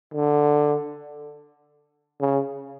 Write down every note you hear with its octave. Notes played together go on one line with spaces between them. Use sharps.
D3
C#3